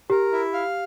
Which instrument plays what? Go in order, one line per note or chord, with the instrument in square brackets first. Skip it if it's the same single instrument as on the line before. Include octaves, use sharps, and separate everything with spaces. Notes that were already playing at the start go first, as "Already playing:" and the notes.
[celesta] G4 [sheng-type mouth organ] A#4
[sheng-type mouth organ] E4
F5